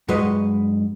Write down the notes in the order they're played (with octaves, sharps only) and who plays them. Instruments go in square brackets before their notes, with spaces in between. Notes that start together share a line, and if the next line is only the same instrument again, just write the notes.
[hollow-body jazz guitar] G2 F#3 G#3 F#4 B4 D#5